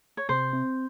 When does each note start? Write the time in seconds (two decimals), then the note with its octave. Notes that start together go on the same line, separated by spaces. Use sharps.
0.17 C#5
0.29 C3 C5
0.53 C4